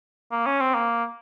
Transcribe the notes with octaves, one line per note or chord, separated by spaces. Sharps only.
A#3
C#4
C4
A#3